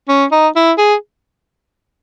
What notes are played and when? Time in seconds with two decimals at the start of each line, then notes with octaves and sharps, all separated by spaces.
0.09 C#4
0.32 D#4
0.56 E4
0.78 G#4